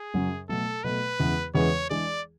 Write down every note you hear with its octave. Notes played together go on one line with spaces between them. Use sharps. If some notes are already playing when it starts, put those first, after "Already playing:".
Already playing: G#4
F#2 C#3 F#3 C#4
B2 F#3 A3 A4
B2 F#3 A3 B4
E2 C#3 E3 G#3 B3
E2 C#3 E3 G#3 B3 C#5
E3 G#3 D4 G#4 D5